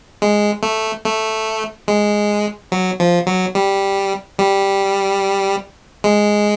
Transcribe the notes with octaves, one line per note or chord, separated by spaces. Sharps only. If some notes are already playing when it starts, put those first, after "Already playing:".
G#3
A3
A3
G#3
F#3
F3
F#3
G3
G3
G#3